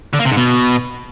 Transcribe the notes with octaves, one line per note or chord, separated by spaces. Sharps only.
D3
A#3
C3
G#2
B2